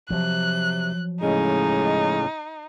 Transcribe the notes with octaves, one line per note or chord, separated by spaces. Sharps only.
C3 F3 F#3 F#6
A2 C#3 G#3 C#4 D#4